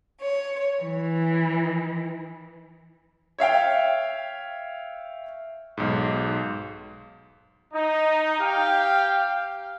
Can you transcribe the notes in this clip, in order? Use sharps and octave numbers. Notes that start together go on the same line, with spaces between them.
C#5
E3
C#5 E5 F5 G5
B1 G#2
D#4
G4 F5 G5